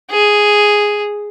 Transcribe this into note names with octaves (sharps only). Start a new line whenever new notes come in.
G#4